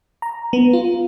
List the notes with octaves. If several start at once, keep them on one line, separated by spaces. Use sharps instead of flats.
A#5
B3
F4